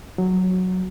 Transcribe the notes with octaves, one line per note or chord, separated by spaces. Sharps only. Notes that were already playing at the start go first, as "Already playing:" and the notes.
F#3